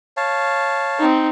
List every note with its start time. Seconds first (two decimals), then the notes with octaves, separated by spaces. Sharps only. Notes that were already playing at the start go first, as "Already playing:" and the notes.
0.17 C#5 F5 A5
0.99 C4 D#4